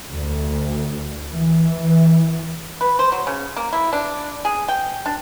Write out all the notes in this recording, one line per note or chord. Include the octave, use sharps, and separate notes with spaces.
D2
E3
B4
C5
F#3
C#3
A#3
E4
D4
G#4
G5
D4